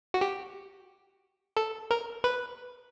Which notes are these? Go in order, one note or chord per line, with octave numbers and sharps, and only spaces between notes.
F#4
G4
A4
A#4
B4